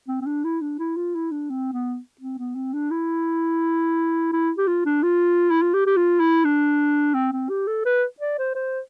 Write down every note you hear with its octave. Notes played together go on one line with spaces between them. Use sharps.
C4
C4
D4
E4
D4
E4
F4
E4
D4
C4
B3
C4
B3
C4
D4
E4
E4
G4
F4
D4
F4
E4
F4
G4
G4
F4
E4
D4
C4
C4
G4
A4
B4
D5
C5
C5